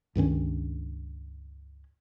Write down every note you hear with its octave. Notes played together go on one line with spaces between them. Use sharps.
C#2 G2 D#3 C#4